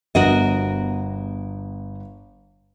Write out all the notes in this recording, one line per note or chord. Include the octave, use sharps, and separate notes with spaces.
G1 B3 F#4 A#4 D#5